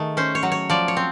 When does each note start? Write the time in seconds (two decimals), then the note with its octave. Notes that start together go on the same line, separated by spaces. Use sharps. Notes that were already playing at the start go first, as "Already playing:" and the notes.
Already playing: D#3 A3 G#4
0.17 C#4 C5
0.35 C#5
0.43 F#3
0.52 C#5
0.70 F3 D5
0.88 C#5
0.97 C4